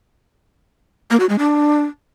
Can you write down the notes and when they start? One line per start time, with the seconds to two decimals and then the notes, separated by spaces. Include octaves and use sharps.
1.11 A#3
1.20 F#4
1.29 G#3
1.39 D4